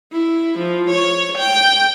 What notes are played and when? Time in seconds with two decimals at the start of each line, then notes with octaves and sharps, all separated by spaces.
0.12 E4
0.59 F3
0.90 C#5
1.39 G5